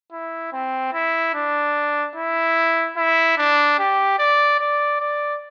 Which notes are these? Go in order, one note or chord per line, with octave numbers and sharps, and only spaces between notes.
E4
C4
E4
D4
E4
E4
D4
G4
D5
D5
D5